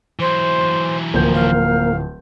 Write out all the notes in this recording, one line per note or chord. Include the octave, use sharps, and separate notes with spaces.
E3 F#3 C5
D1 F3 A#3 A#4 G6
F5